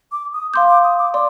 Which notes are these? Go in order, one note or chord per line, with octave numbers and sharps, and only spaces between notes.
D6
D#6
F5 C6 D6 G6
D6
D#6
D6
D5 C6 D6